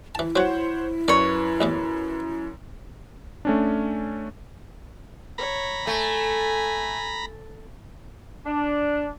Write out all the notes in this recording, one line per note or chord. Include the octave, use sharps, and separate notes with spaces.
E3 E4 A5
F#3 F#4 C5 C#5 F#5
F#2 B4 C#5 D5
A1 E2 E3
A3 C#4 D4
C#5 A#5 B5
A3 G#5
D4